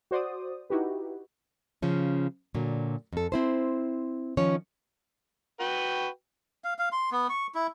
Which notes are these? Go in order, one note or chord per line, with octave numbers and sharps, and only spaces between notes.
F#4 C5 D5 D#6
D#4 E4 F#4 G4 B4
C#3 F3 C#4
A#2 D3 F#3
F2 A4
C4 E4 C5
D#3 F3 C#4 C#5
F#4 B4 G5
F5
F5
C6
B3
C#6
E4